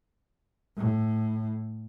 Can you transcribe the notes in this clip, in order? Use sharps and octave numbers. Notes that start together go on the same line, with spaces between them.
A2